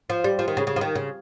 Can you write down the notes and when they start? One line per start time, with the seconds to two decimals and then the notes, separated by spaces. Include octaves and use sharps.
0.10 F3
0.24 G3
0.39 F3
0.48 D#3
0.57 C#3
0.67 C#3
0.76 F3
0.81 D#3
0.95 C#3